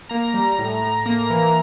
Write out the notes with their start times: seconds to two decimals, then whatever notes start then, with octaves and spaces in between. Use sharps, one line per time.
0.09 A#3 A#5
0.34 G3
0.58 A2
0.82 A2
1.06 A#3 A#5
1.30 E3